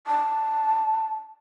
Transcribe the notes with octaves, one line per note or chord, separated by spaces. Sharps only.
A5